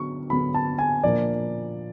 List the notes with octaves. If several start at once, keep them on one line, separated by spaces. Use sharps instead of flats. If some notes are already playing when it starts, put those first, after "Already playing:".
Already playing: D3 F#3 B3 C#6
D3 F#3 B3 B5
A5
G#5
A#2 F3 A#3 D4 D5